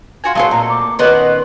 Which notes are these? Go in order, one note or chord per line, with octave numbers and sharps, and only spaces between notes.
F4 F#4 G#5
F#3 C4 G#4 A4 C5 D#5 F5
A#2 A#5
D6
D#3 B3 C#4 C5 D5 D#5 F#5